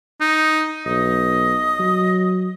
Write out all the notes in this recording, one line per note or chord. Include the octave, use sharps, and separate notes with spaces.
D#4
B1 D#5
F#3